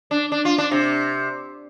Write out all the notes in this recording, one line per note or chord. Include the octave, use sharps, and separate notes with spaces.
D4
D4
F4
D4
C3